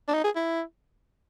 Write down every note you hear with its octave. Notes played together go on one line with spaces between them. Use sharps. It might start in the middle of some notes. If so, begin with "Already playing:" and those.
D4
D#4
G#4
E4